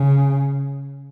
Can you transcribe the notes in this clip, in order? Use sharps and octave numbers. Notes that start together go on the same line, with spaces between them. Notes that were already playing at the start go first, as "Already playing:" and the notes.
Already playing: C#3